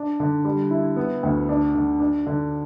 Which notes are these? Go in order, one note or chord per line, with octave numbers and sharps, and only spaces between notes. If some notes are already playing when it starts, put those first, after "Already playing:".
Already playing: D4
D3
G3
E4
B3
D2
D4
D3
D4
D3